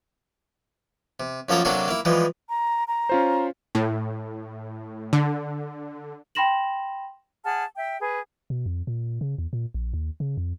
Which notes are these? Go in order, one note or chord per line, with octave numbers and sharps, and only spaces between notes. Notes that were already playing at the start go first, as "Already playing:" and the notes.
C3
F#2 F3 A#3 A4 C#5 A#5
C3 F#3 A#3 D4 F#4 A4
A#3 E4
E3 F3 G3 G#3
A#5
A#5
C#4 F4 C5
A2
D3
G5 B5 C6 A#6 E7 F#7
G#4 F#5 A5 F6
E5 G5
G#4 B4
B2
F2
A#2
C#3
E2
A#2
A#1
D#2
C#3
F2